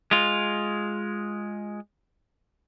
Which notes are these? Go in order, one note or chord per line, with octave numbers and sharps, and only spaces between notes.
G#3 F4